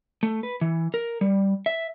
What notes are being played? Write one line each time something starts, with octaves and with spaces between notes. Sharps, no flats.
A3
B4
E3
A#4
G3
E5